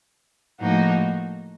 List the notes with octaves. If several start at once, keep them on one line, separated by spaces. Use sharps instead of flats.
A2 F3 A#3 D#4 F#4